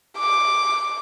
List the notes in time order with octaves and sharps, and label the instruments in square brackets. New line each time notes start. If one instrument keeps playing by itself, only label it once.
[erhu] D6